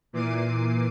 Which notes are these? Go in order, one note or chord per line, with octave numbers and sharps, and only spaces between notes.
A#2 E3 D6 C7 D#7